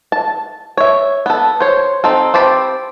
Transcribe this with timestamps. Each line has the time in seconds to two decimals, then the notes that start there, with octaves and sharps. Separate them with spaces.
0.12 A5
0.77 C#5 E5
1.26 B3 A4
1.60 C5 C#5
2.04 C4 D#4 A4
2.34 C4 G4 A5 B5